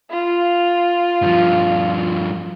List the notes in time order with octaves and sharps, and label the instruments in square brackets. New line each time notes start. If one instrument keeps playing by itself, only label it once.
[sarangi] F4
[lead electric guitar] G2 F3